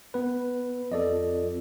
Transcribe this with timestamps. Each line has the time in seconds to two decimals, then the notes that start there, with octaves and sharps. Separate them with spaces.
0.14 B3 B4
0.92 F2 A4 D5 D#5